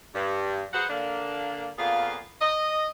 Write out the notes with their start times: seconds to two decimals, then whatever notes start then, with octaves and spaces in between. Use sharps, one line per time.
0.15 G2
0.73 F#3 G#4 B4 C5 F#5
0.89 D3 A#3 D4
1.78 F2 A#2 B3 F4 G#4 F5
2.41 D#5